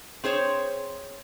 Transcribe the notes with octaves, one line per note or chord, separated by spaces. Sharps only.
C4 G#4 C5 C#5